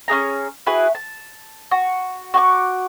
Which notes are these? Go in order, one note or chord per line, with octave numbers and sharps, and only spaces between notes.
C#4 D4 G#4 A#5
E4 F#4 G#4 B4
A5
F#4
F#4 C#6 D6